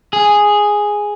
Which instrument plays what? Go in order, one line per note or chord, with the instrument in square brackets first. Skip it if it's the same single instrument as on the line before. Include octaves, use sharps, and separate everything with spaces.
[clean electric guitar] G#4